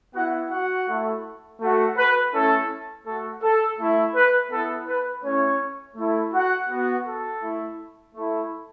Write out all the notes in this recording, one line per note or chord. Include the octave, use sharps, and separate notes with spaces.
B3 E4 F#4 F#5
F#4 F#5
A3 E4
A3 F#4
B4
A3 C#4 E4 A4
A3 F#4 A4
A4
A3 E4
B4
B3 E4 A4
B4
A3 C#4 E4 C#5
A3 E4
F#4 F#5
B3 F#4
A4
A3 E4
A3 E4